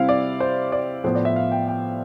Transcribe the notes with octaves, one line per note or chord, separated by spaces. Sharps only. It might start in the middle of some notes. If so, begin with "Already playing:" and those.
Already playing: C3 G3 C4 E4 F5
D5
C5
D5
A2 F3 B3 C5
D5
E5
F5
G5
G5